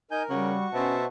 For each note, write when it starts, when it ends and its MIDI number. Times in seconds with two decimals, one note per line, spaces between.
0.11 0.23 63
0.11 0.50 70
0.11 0.23 80
0.11 0.23 91
0.30 0.58 49
0.30 0.67 55
0.30 1.06 66
0.30 1.06 85
0.74 1.06 47
0.74 0.98 61
0.74 1.05 72
0.74 1.05 76
0.74 1.05 81